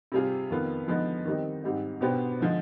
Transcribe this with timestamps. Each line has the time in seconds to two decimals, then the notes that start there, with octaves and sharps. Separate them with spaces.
0.12 C3 G3 C4 F4 G#4
0.51 F2 D#3 B3 F4
0.87 D3 F3 G#3 B3 D#4
1.25 D#3 G3 C4 D#4
1.64 G#2 G3 C4 D#4
2.01 B2 B3 D4 G4 C5
2.40 D3 F3 G#3